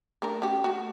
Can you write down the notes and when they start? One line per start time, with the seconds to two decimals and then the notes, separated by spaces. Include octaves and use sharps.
0.22 A3 D4 A#4
0.42 C#4 F#4 G4
0.64 A3 F#4